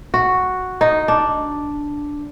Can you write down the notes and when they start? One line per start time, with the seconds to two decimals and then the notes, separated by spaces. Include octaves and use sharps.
0.14 F#4
0.81 D#4
1.08 D4